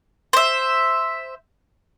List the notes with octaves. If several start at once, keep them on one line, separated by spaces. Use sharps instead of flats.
C5 E5